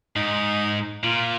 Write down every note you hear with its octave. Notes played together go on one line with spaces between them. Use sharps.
G#2 D#4
A#2 F4